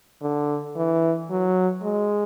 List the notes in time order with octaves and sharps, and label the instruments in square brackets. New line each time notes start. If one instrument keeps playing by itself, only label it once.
[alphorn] D3
E3
F#3
G#3